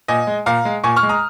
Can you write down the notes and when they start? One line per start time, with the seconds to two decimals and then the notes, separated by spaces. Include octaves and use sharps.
0.08 A#2 D#5 G#5
0.27 G#3
0.46 A#2 F5 A#5
0.65 G#3
0.84 A#2 G#5 C#6
0.96 C#6 F6
1.03 G#3
1.09 A#5 D#6